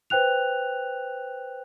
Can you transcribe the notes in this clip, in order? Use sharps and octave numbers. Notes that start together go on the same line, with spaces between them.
B4 C5 G5 F#6 F7